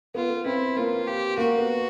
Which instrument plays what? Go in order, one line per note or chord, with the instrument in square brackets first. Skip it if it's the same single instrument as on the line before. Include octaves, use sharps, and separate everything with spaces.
[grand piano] B3 [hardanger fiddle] F4
[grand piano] B3
[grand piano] C4 [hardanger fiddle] E4
[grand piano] A#3 [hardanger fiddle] F4
[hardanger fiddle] G4
[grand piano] A#3 [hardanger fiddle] F#4
[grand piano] B3